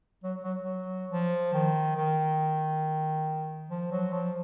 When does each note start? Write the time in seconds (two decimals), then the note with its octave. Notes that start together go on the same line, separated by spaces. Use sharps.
0.24 F#3
0.44 F#3
0.63 F#3
1.11 F3
1.54 D#3
1.96 D#3
3.69 F3
3.91 F#3
4.13 F3